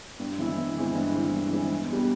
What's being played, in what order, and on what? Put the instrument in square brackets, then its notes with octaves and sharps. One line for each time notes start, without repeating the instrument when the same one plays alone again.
[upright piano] G2
E3 G#3 C4 E4
G2
E3 G#3 C4 E4
G2
E3 G#3 C4 E4
G2
E3 G#3 C4 E4
E2
B2 G3 B3